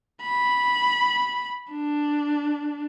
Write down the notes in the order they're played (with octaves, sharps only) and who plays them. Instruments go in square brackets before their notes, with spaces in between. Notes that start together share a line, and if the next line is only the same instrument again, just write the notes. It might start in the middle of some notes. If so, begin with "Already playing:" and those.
[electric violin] B5
D4